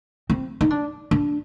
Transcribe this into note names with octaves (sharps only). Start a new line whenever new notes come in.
C4
D#4
D4
D4